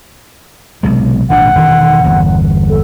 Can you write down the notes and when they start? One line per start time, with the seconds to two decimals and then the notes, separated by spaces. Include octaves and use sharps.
0.83 B1 C3 G#3
1.30 G#1 A#2 D4 F#5
1.55 E1 D#3
2.04 G1 E2
2.69 A4